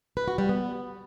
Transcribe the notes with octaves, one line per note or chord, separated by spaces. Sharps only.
B4
F#4
G3
B3